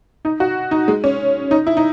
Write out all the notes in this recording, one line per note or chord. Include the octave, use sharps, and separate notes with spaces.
D#4
F#4
D#4
G#3
C#4
D#4
E4
D#4